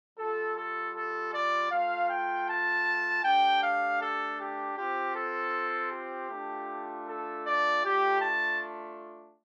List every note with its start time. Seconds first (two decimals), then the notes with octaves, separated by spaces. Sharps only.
0.18 G3 F4 A4
0.57 A4
0.95 A4
1.33 D5
1.71 A3 F4 F5
2.10 G5
2.48 A5
3.24 A3 D4 G4 G5
3.63 F5
4.01 A4
4.39 G4
4.77 C4 F4 G4
5.16 A4
5.92 G4
6.31 A3 D4 F4
7.08 A4
7.46 D5
7.84 A3 D4 F4 G4
8.22 A5